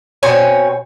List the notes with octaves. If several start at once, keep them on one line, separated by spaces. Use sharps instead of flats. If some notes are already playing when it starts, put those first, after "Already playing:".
B2 C4 C#5 G#5